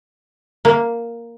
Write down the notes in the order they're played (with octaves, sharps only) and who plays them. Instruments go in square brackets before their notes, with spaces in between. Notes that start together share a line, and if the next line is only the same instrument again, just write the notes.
[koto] A#3